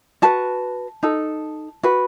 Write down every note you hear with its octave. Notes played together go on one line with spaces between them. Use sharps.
F#4 B4 A5
D#4 A4
F#4 B4